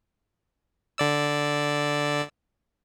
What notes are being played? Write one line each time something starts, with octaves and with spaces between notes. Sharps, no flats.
D3 D5 E6